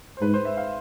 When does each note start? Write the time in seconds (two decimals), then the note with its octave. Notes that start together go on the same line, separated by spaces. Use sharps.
0.17 C5
0.22 G#2 B4
0.34 C5
0.45 E5
0.57 F5